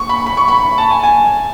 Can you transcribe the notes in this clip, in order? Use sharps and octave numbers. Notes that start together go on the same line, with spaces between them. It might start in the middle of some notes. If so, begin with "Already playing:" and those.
Already playing: C#6
B5
B5
C#6
B5
A5
G#5
G#5